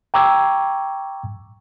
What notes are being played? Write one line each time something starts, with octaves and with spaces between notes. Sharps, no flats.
G5 A#5 C#6 D6 E6 G#6